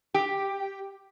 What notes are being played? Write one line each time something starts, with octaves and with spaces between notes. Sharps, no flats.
G4